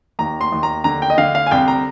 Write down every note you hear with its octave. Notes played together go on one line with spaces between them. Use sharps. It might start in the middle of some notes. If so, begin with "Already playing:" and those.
D#2 A#5
C6
D#2
A#5
D3 A#5
G5
D#5
D3 F5
F5
G#5
C2 G5
A#5